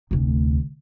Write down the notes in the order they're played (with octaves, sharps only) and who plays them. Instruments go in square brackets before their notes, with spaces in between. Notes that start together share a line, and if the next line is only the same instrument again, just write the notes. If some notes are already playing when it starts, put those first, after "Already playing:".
[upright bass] F1 D2